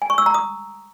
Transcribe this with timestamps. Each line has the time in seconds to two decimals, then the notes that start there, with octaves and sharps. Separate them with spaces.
0.02 G#5
0.10 C#6
0.18 E6
0.26 A#5
0.34 D#6